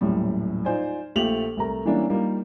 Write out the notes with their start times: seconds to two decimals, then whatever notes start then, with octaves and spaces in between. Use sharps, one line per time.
0.01 D#1 F#2 A2 G3
0.65 D#4 F4 C5 D5 G#5
1.16 A#1 A3 F4 G4 F7 F#7
1.57 C2 A3 A#4 A#5
1.85 E3 G3 A#3 C#4 D4 E4
2.10 G3 A#3 D#4 F4